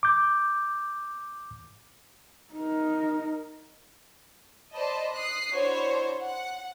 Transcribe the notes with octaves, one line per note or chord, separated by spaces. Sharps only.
D6 G6
D#4 A#4
C5 D5 D#5 A5 B5
D#6 F#6 C7
D4 E4 F#4 C5 C#5
F#5